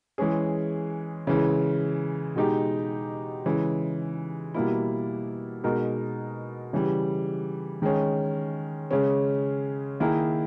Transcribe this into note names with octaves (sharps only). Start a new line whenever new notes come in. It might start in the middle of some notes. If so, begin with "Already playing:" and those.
E3 G#3 C#4 G#4
C#3 E3 G#3
B2 G#3 D#4 G4
C#3 E3 G#3
B2 G3 A#3 E4
B2 G#3 D#4 A#4
C#3 E3 G3
D#3 G#3 C#4
C#3 G#3 C#4
D#3 A#3 E4 G#4